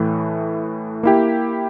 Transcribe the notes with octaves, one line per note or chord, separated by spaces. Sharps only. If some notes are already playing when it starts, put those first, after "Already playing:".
Already playing: A2 E3 A3 E4
A#3 E4 G4